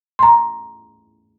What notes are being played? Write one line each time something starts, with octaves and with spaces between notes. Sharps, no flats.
A#5 C6